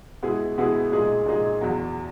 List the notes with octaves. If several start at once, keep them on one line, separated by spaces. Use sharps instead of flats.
B2 G#3 B3 E4 G#4
B2 G#3 B3 E4 G#4
A#2 G#3 D#4 G#4
A#2 G#3 D#4 G#4
E2 B2 F#3